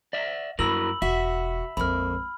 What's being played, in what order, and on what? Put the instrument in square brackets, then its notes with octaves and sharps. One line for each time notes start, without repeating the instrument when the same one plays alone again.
[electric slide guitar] D5 E5
[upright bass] F#2 [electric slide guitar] E4 F#4 A#4 [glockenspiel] B5 E6 F#7
[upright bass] E1 [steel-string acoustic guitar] F#4 [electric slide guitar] E5
[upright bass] A#1 G#3 [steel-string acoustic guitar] F2 A#3 [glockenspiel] B5 F6